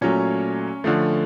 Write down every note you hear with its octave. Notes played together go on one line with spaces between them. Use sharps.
A#2 F#3 A3 C#4 C#5
D3 F3 A3